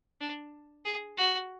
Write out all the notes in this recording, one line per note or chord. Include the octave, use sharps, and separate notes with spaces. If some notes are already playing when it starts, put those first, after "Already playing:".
D4
G#4
F#4